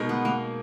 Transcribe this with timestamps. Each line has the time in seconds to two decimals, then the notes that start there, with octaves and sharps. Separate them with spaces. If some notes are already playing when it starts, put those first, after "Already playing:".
Already playing: B2 G#3 D#4 A#4
0.09 B3
0.25 A#3